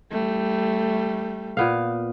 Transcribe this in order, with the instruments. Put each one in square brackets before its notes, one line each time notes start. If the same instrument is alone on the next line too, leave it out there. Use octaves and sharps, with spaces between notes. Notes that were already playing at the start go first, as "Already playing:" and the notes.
[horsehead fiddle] G3 A3
[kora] A#2 B3 F5